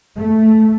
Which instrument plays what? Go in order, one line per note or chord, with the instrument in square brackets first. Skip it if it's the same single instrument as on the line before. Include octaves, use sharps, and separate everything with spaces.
[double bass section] A3